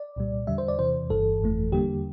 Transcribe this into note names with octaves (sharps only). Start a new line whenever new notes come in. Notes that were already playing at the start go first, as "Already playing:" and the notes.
Already playing: D5
C2 A#2 G3
E2 D3 G3 E5
C5
D5
E2 C3 E3 C5
G1 G2 E3 A4
G1 F2 E3 A3
E2 D3 G3 A#3 G4